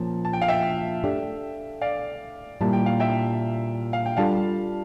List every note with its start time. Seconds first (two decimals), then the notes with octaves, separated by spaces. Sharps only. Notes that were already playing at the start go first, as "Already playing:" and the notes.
Already playing: A#2 F3 A#3 C#4 A5
0.25 A5
0.33 G5
0.41 F5
0.48 E5 G5
1.04 A3 D4 G4
1.81 D5 F5
2.61 A#2 G3 A#3 E4 A5
2.73 G5
2.86 F5
3.00 E5 G5
3.93 F5
4.06 G5
4.17 G3 D4 F4 A4 F5 A5